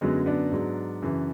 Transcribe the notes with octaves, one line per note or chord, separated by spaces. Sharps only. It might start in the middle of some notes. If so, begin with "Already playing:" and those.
F#2 D3 F#3 G#3 B3
B3 D4
G#2 F#3
F#2 C#3 E3